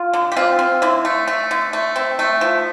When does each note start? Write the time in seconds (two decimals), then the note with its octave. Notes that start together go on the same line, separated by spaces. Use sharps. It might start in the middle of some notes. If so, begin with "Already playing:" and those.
Already playing: F4
0.14 D3
0.32 G4
0.36 C4 F4
0.59 C4
0.82 D3 E4
1.05 A3
1.28 A3
1.51 D3
1.73 A3
1.96 C4
2.19 A3
2.41 F3